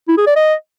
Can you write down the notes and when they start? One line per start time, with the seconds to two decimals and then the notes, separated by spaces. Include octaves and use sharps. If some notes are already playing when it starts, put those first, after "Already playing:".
0.08 E4
0.17 G#4
0.27 D5
0.36 D#5